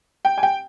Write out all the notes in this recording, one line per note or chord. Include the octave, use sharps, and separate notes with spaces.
G5
G#5
G5